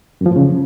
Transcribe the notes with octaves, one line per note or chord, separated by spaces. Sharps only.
F#2
F3
A2
C#3